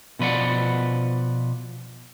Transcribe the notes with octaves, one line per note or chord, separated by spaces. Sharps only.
B2 F3 B4 D5 F#5